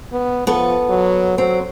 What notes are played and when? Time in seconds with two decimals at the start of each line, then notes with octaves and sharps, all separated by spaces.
0.13 B3
0.47 F3 B3 A4 B4
0.90 F#3
1.38 F#3 C4